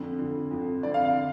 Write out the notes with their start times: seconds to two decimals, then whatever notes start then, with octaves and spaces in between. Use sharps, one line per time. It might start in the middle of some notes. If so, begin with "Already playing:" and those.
Already playing: F2 D3
0.19 F2 D3
0.51 F2 D3
0.82 F2 D3 D5
0.94 F5
1.05 F5
1.16 D3